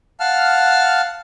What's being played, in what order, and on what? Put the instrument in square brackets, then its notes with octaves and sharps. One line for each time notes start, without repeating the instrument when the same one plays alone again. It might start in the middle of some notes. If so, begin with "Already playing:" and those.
[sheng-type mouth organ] F5 F#5 A5 F6